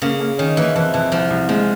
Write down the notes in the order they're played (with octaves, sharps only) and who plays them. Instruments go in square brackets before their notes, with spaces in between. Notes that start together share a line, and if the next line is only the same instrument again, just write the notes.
[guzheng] C#3 [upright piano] A#3
[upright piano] A#3
[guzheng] D#3 [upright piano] C#4
[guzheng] E3 [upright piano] A#3
[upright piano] F2 [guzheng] E3
[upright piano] F2 [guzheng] E3
[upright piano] C2 [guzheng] F3
[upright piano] C2
[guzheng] F3 [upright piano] G#3